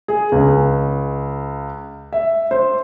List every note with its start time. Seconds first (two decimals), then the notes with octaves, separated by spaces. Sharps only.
0.08 G#4
0.32 C#2
2.13 E5
2.51 C5